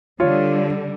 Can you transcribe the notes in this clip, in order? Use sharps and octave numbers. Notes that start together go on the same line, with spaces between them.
D3 G3 F4 C#5